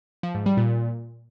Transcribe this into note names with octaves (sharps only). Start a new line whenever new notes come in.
F3
G#2
G3
A#2